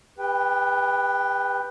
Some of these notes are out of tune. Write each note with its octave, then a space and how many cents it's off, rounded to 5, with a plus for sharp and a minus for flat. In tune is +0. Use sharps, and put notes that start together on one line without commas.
G4 +40 B4 +0 G5 +0